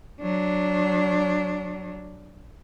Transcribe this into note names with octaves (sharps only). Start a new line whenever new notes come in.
F#3 D4